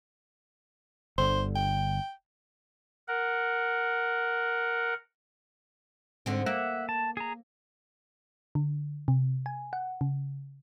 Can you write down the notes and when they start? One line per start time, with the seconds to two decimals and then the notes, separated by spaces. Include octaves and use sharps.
1.18 G1 D3 C5
1.56 G5
3.08 A#4 F#5
6.26 G#2 D3 C4
6.46 A#3 E5 F#5
6.89 A5
7.17 G#4 A#5
8.55 D3
9.08 C3
9.46 G#5
9.73 F#5
10.01 C#3